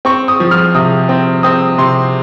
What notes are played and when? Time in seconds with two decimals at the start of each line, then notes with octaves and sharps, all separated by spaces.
0.05 C4 C#6
0.28 D#6
0.40 F3
0.51 F6
0.75 C3 D#6
1.09 C4
1.43 C4 D#6
1.78 C3 C6